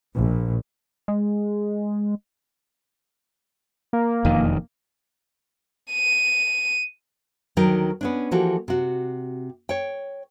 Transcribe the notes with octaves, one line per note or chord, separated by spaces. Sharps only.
A#1
G#3
A#3
E1 F2 D#3
D#7
D2 D#3 F#3 A#4 G5
B3 C#4 D4
E3 F3 A#3 F#4 G4 A4
C3 F#4
C#5 G5